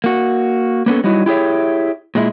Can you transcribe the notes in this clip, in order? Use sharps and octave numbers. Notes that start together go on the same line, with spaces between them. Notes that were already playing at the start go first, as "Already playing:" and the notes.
A#3 F#4
A#3 B3 C#4 A4
F#3 G3 D#4 E4 F#4
E4 G4 G#4 C#5 E5
A#2 G#3 E4